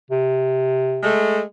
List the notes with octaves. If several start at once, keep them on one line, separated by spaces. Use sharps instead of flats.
C3
G#3 A3